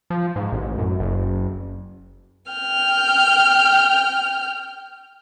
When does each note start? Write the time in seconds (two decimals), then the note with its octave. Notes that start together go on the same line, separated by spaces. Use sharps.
0.10 F3
0.36 G#2
0.52 A1
0.78 F#2
1.00 F#1
2.51 G5 F6